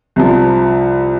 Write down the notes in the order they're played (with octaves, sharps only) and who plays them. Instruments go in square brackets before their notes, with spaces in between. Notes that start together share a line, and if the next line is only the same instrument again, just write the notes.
[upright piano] C2 C3 F3